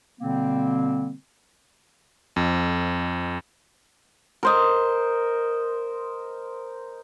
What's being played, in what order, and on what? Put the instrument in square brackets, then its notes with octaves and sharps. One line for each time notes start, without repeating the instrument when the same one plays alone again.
[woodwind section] B2 D3 G3 A#3 C4
[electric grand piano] F2
[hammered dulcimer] A#4 C5 D#5